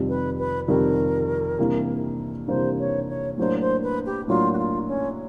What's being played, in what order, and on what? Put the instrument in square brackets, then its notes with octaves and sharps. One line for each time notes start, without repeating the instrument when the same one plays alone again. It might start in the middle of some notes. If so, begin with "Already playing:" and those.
Already playing: [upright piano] F2 C3 D#3 G3
[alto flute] B4
B4
[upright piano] F2 C3 D#3 G3 [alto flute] A#4
[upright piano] C3 E3 G3 A#3 D4
[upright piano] C3 E3 G3 A#3 D4 [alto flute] C5
[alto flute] C#5
C#5
[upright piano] A2 F#3 A#3 D4 [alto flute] C5
[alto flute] C5
B4
G4
[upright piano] A2 F#3 A#3 D4 [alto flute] F4
[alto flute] F#4
F4
C#4